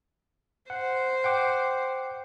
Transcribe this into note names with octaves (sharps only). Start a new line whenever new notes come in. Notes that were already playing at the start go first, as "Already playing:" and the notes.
C5 F#5
F#5 G5 D6